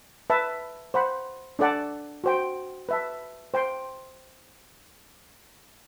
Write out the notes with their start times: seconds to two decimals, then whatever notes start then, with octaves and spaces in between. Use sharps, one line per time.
0.30 B4 E5 A5
0.94 C5 F#5 B5
1.59 D4 A4 D5 F#5 A5
2.24 F#4 C5 G5
2.89 B4 E5 A5
3.54 C5 G5 C6